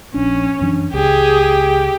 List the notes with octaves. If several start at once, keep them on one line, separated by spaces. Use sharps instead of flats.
A#1 C#4 D4
F#2 E3 D4
C#2 G4 G#4